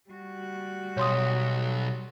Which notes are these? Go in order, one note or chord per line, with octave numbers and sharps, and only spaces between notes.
G3 F#4
B1 C#5 C6 D#6